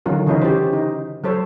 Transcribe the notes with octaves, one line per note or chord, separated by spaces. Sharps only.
D3 D#3 F#3 C#4 F4 A#4
C#3 E3 C#4 D#4 F#4 B4
G4 C5
D#4
F#3 A4 C5 C#5